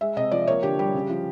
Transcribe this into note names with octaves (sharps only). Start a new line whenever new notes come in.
G#3 E5
C3 D#5
F3 D5
A#3 C#5
D3 G4
G3 G4
C#3
F3